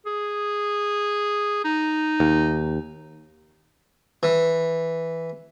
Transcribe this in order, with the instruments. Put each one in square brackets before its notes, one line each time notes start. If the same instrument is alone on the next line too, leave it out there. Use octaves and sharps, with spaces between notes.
[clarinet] G#4
D#4
[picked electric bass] D#2
[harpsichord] E3